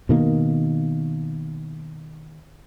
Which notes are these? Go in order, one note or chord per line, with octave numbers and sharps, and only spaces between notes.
B2 D#3 A#3